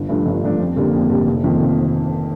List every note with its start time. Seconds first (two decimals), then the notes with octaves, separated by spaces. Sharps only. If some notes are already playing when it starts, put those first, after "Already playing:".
Already playing: G1
0.09 G2 F3 A3 D4
0.26 G1
0.43 G2 F3 A3 D4
0.59 F2
0.76 D3 G3 A#3 D4
0.93 F2
1.10 D3 G3 A#3 D4
1.27 F1
1.44 F2 D#3 A#3 F4
1.61 F1